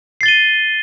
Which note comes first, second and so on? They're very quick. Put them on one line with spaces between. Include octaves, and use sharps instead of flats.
C7 A6 G7 D#7